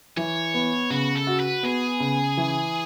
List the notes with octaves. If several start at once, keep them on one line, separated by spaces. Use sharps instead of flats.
E3 C#5
B3
C#3 F#4
A4
F#4
B4
B3 G#4
C#3
E3